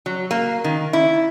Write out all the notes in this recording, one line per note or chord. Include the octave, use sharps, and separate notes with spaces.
F#3
A#3
D#3
E4